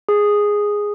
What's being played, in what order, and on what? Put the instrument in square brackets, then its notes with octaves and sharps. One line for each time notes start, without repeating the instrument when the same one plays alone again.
[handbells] G#4